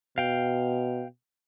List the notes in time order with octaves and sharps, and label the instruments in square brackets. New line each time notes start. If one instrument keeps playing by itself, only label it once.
[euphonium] B2 [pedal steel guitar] F5 G5